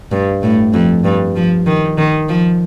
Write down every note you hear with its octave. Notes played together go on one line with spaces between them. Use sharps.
G2
A2
F2
G2
F3
D#3
D#3
F3